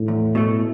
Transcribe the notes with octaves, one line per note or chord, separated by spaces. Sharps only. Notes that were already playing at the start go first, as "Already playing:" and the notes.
Already playing: A2
E2
B2 A3